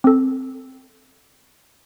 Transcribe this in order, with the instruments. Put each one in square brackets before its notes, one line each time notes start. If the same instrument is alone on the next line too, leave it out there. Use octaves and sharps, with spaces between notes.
[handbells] C4 A4